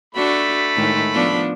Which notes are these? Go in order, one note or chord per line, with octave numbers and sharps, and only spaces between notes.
A3 D4 F#4 B5
A2 D#3 G#3
F3 B3 D4